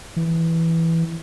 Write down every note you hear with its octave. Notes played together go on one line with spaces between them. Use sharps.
E3